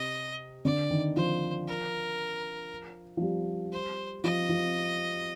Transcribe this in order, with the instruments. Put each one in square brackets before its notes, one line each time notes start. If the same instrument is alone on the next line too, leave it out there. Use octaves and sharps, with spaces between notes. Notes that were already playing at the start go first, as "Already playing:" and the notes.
Already playing: [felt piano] C3 [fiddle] D#5
[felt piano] D3 [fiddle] D5
[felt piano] D#3
[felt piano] F3 [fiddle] C5
[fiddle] A#4
[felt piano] F3
G3
[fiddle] C5
[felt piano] F3 [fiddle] D#5
[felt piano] F3